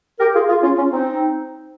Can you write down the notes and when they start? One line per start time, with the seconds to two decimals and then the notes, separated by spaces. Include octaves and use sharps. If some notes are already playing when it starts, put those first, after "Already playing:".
0.19 G4 A#4
0.34 F4 G#4
0.49 F4 G#4
0.63 C#4 F4
0.77 C#4 F4
0.91 C4 D#4